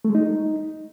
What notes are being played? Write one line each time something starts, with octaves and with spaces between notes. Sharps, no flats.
A3
G#3
D#4